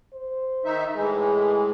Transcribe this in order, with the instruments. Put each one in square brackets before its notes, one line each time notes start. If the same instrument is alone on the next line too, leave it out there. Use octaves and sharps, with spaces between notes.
[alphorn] C5
[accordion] D#3 D#4 E5
[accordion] A2 E3 G#3 [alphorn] G#4